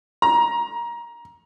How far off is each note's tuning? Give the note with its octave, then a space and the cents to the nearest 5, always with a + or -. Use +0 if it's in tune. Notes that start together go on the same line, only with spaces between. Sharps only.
A#5 +20